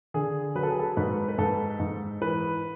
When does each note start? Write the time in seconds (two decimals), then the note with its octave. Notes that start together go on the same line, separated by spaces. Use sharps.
0.14 D3 G#4
0.55 F#3 B4
0.63 A4
0.71 G#4
0.79 A4
0.97 G#2 B4
1.28 B4
1.38 G#2 A4
1.80 G#2
2.21 E3 B4